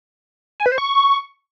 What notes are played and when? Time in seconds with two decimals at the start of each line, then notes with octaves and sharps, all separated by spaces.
0.60 G#5
0.66 B4
0.72 C5
0.78 C#6